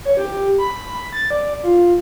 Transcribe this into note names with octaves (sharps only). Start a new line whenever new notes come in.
C#5
G4
B5
A6
D5
F4